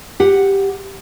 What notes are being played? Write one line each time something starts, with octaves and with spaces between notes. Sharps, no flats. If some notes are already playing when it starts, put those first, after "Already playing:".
G4 F#5